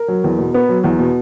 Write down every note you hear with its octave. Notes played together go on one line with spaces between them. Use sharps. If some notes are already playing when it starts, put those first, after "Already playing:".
Already playing: A#4
F#3
E2
B2
B3
F#3
E2
B2